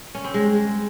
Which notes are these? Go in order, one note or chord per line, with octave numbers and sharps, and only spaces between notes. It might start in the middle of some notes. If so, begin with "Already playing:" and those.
C#4
C4
G#3